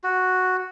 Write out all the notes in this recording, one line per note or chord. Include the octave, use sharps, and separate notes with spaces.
F#4